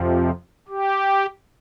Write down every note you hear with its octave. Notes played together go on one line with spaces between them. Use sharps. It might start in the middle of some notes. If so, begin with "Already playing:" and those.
Already playing: F2 C3 F3
G4